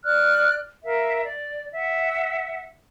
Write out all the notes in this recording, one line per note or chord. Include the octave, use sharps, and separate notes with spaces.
D5 F6 F#6
A#4 E5 F5
D5
E5 F#5